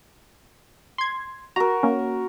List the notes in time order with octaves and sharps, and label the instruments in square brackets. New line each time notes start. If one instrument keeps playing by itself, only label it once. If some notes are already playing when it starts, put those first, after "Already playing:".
[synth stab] C6 G#6
[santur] F#4 A#4 [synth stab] A#5
[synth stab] A#3 C#4